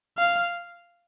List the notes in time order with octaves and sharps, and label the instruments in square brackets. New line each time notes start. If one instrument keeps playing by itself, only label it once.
[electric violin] F5